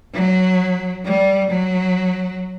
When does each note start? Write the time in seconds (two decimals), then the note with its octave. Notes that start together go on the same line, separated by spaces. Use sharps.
0.14 F#3
1.05 G3
1.51 F#3